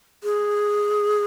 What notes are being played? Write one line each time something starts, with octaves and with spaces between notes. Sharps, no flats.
G#4